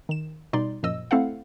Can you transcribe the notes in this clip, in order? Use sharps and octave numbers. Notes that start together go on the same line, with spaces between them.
D#3 E7
B2 G3 D#4 D5 C6
F#2 A#2 F3 D#5 E6
A3 C4 E4 A4 F5 F#5